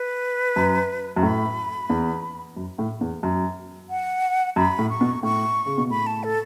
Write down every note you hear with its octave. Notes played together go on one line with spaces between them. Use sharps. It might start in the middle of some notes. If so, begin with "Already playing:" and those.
Already playing: B4
F#2
F#2
A2 B5
E2
F#2
A2
E2
F#2
F#5
F#2 B5
A2
C#6
B2
A2 C#6
C#3
B2
A2 B5
A5
A4